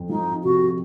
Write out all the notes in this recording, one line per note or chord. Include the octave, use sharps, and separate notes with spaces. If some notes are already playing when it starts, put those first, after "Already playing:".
Already playing: F2
F3 D#4
C3 F#4